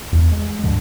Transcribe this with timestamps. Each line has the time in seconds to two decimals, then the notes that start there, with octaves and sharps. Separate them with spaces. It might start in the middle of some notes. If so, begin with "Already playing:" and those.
0.12 E2
0.32 G#3
0.63 D2 G#2 D3 F3